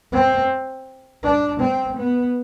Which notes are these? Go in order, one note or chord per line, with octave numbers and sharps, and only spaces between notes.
C4
D4
C4
B3